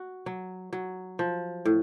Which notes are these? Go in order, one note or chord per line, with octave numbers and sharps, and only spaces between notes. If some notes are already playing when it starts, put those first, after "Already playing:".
Already playing: F#4
F#3
F#3
F3
A2